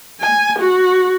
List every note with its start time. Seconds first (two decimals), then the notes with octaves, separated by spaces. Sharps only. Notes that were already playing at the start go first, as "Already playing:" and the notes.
0.21 G#5
0.59 F#4